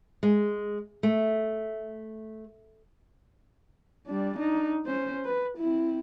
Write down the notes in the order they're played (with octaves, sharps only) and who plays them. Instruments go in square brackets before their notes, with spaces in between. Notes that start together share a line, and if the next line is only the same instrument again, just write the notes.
[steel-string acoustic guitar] G#3
A3
[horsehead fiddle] G3 D4
D4 D#4
C#4 C5
B4
C4 E4